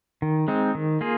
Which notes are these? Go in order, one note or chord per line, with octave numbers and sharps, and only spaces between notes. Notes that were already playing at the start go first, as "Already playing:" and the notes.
D#3
G#3 C4 D#4
D#3
A#3 F4 G#4